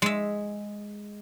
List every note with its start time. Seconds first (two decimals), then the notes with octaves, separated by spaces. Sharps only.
0.02 G#3 E5